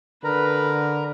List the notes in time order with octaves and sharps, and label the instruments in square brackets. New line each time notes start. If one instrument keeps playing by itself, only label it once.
[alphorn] D3 [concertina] A#4 A#5 [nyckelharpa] B4